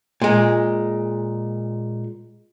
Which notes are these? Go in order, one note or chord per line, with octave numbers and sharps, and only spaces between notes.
A#2 G#3